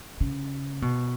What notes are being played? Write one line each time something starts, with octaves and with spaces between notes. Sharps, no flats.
C#3
B2